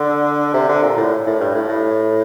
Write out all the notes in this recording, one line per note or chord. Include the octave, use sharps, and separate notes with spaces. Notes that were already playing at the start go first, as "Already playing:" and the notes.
Already playing: D3
C3
D3
A#2
A2
A2
G2
A2
A2